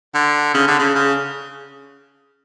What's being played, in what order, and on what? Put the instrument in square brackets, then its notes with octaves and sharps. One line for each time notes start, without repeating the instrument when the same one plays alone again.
[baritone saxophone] D3
C#3
D3
C#3
C#3